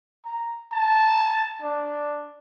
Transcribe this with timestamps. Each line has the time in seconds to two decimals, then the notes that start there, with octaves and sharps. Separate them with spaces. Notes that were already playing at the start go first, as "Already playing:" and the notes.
0.25 A#5
0.72 A5
1.62 D4